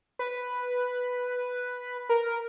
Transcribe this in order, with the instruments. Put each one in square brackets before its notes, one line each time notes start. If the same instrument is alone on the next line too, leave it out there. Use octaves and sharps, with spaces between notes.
[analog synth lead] B4
A#4